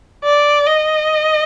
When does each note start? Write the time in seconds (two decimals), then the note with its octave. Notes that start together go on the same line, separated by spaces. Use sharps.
0.24 D5
0.66 D#5